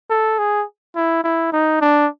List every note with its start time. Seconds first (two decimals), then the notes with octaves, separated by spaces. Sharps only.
0.10 A4
0.39 G#4
0.96 E4
1.24 E4
1.52 D#4
1.81 D4